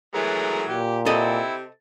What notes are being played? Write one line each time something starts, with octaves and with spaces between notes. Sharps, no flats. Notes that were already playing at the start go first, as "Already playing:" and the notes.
E3 F#3 G#3 A3 A#4
A#2 G4
C3 C4 E4 G4 A4 D#5